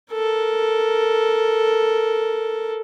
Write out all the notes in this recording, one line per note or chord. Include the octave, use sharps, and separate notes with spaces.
A4 A#4